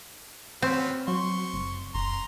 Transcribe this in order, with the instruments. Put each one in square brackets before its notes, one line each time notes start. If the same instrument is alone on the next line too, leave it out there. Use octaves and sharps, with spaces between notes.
[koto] C4 [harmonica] C#4 F#4 B4
[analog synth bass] F#3 [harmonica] C6 C#6
[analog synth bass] F#1
[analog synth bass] F#1 [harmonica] A#5 C6